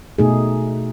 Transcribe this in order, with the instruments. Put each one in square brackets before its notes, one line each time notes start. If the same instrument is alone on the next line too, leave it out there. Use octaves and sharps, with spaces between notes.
[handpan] B2 A3 D#4 G#4